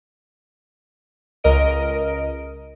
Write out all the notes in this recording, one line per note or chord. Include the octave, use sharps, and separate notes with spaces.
C#2 A#4 D#5 D7